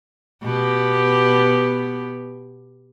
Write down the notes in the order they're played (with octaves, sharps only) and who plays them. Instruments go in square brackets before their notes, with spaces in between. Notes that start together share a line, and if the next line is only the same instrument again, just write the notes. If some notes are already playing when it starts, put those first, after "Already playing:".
[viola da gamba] B2 B3 G4